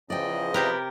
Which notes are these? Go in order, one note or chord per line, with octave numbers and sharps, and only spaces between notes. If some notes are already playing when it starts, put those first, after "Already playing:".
E2 C#3 F3 D5 D#5 G5
C3 G4 A#4 B4